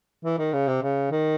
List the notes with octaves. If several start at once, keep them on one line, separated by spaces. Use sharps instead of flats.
E3
D#3
C#3
C3
C#3
D#3